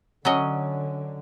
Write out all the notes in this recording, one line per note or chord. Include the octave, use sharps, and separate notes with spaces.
D3 F#3 C#4 D#5